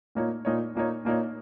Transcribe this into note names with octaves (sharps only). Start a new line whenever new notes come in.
A#2 A#3 D#4 C#5
A#2 A#3 D#4 C#5
A#2 A#3 D#4 C#5
A#2 A#3 D#4 C#5